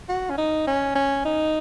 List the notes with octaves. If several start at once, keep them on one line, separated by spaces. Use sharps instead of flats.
F#4
C#4
D#4
C#4
C#4
D#4